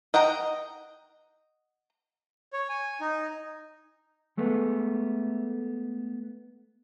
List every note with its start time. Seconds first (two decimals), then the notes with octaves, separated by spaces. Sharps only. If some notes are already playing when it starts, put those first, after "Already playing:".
0.14 D#5 F#5 G5 A#5
2.53 C#5
2.69 G#5
3.01 D#4
4.37 G#3 A3 B3